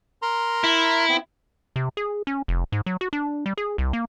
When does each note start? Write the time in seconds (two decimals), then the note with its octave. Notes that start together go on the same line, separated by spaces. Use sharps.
0.22 A#4 A#5 C6
0.64 E4
1.09 B3 C4
1.76 C3
1.97 G#4
2.27 C#4
2.48 F1
2.72 G#2
2.86 F#3
3.01 F#4
3.13 D4
3.46 G3
3.58 G#4
3.78 C2
3.93 A#3